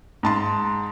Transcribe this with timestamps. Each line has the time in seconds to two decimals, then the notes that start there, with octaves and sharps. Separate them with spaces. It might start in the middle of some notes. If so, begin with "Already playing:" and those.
0.23 G#2 A5 C6